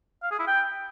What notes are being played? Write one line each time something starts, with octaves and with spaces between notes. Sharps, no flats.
F5
G#4
E4
G5